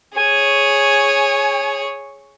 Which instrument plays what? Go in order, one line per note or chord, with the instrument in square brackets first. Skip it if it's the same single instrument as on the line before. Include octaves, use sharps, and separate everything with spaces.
[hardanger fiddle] G#4 C#5 [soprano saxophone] G#5